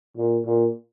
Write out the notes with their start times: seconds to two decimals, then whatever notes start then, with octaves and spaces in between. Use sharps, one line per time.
0.17 A#2
0.45 A#2